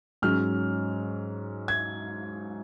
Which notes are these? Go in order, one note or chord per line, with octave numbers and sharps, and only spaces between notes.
G#2 F#3 C#4 F6
G#6